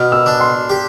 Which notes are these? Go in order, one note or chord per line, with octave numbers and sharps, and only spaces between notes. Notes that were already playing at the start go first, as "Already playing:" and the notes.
Already playing: B2 F6
E6
D4
C6
G4